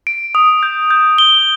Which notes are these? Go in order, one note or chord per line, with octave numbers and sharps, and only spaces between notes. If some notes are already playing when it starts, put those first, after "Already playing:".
D7
D#6
G6
G6
G7